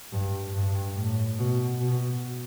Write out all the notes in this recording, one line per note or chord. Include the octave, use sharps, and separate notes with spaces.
G2
G2
A2
B2
B2